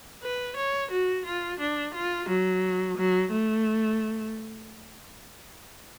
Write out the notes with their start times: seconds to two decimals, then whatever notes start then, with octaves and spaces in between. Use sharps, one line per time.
0.23 B4
0.56 C#5
0.91 F#4
1.26 F4
1.60 D4
1.94 F4
2.29 F#3
2.98 F#3
3.31 A3